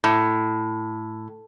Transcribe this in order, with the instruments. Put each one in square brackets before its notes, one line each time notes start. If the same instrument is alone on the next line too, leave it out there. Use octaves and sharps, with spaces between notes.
[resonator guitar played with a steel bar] A2